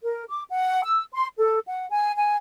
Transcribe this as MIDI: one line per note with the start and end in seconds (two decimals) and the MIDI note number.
0.03 0.23 70
0.29 0.42 86
0.50 0.81 78
0.84 1.03 88
1.13 1.28 84
1.38 1.59 69
1.67 1.86 78
1.90 2.15 80
2.16 2.37 80